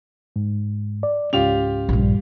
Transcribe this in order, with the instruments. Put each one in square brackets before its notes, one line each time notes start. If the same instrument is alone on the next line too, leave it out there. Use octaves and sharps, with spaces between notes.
[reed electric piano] G#2
D5
[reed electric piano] C#2 G#2 C#4 [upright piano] F4 G4 F7
[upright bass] A#1 G2